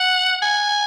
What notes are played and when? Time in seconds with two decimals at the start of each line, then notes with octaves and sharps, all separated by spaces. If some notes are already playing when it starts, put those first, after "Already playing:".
Already playing: F#5
0.42 G#5